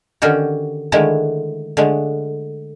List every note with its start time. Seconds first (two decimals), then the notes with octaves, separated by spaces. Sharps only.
0.22 D3 D#3 C#4 F#4 G4
0.92 D3 D#3 G#3 A3 E4
1.77 D3 G#3 A3